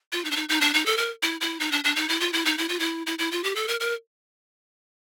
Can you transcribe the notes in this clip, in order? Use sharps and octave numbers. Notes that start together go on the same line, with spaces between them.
F4
D#4
D4
D#4
D#4
D4
D#4
A4
A#4
E4
E4
D#4
D4
D4
D#4
E4
F4
E4
D#4
E4
F4
E4
E4
E4
F4
G4
A4
A#4
A#4